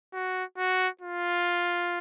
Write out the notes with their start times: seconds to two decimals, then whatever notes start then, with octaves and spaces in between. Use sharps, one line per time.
0.14 F#4
0.58 F#4
1.01 F4